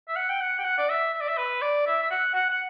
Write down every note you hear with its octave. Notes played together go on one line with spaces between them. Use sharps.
E5
F#5
G5
F#5
G5
F#5
D5
E5
E5
D5
E5
B4
D5
E5
E5
F#5
F#5
F#5